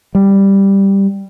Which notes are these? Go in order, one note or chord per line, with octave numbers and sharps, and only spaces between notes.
G3